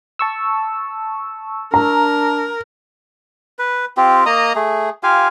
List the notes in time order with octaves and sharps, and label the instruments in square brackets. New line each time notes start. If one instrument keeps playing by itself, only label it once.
[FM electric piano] A5 C#6 E6
[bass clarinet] D4 [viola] A#4 [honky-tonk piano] A#5
[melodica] B4
C4 F4 G4
A#3 D#5 A#5 D#6
A3 G#4
F4 G4 F5 G#5